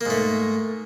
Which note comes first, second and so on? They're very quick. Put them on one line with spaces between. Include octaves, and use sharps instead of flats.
A#3 G#2 A3